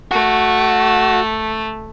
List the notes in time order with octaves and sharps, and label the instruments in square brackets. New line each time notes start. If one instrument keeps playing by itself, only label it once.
[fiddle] A3 [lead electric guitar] F#4